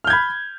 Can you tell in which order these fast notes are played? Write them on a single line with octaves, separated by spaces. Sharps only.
F6 G6 G#6 B5